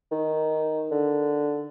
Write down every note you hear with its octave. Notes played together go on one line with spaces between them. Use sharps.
D#3
D3